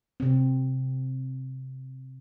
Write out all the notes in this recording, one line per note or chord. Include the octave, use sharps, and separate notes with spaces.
C3 C4